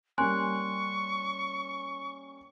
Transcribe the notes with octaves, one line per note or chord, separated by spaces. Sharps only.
G3 A#3 C#4 G#5 C6 C#6 F#6